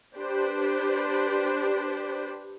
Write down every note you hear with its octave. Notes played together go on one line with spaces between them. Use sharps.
D4 G4 B4 C5